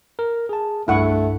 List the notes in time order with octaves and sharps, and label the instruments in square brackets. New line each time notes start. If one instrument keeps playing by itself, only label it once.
[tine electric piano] A#4
G#4 A5
[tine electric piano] C2 G2 [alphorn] A3 [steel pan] E4 F#5 C#6